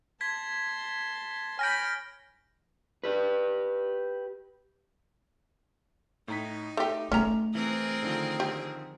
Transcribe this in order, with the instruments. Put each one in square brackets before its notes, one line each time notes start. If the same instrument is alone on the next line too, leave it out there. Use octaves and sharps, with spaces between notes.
[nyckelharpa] A5 C6 [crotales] G#6 B6
[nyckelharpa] C#5 B5 [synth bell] G#5 G6 [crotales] F6 A#6 D7
[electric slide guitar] G4 B4
[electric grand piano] A2 A#5 B6 [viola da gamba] D#4
[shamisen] A3 G4 [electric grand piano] D6
[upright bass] A3 [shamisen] C#4 A#5
[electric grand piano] E3 B4 [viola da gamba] C4 G#4 A#4
[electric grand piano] D3 D#3 F3
[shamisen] G4